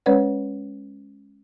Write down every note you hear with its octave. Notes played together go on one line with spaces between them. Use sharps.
G#3 C#4 B4 C#5 D5 F#5